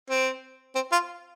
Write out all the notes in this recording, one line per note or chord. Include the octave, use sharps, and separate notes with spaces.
C4
C4
F4